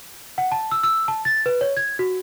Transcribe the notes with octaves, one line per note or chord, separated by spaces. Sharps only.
F#5
A5
E6
E6
A5
A6
B4
C#5
G#6
F#4